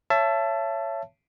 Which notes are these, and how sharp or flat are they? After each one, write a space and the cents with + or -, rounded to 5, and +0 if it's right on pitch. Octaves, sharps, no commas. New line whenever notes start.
C#5 +0 E5 +30 A5 +0